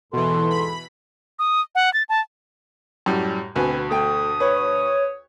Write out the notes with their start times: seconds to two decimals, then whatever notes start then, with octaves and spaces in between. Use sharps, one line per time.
0.13 E2 G#2 B2 E3 A4 C6
0.50 B5
1.39 D#6
1.75 F#5
1.93 A6
2.09 A5
3.06 F#2 A2 G3
3.56 D2 B2 C4 B4 G#5
3.91 A3 G5 D#6
4.40 B4 C#5